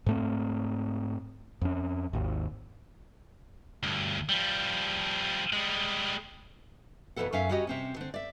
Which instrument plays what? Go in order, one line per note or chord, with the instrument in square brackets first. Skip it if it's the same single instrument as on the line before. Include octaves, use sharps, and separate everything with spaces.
[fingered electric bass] G#2 A3 C4
F2 C#4
G#1 D#2
[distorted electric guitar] D2 G2
F3 G3
G3 G#3
[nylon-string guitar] F2 B2 D#3 E3 A4 F#5
F#2 C#4 E5 F5
G3 C#4 F#4 G4 D5 D#5
C3 C4 C#4
D3 C4
D5 E5